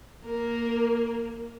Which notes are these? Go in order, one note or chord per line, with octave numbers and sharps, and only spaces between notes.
A#3 A#4